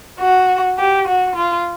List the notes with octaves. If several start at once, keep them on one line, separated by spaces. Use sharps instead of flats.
F#4
G4
F#4
F4